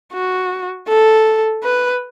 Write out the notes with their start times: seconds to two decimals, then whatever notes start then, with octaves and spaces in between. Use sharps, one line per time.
0.13 F#4
0.88 A4
1.64 B4